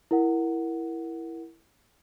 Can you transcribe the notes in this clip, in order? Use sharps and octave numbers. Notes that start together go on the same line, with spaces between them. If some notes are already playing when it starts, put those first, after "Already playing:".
E4 A#4 F#5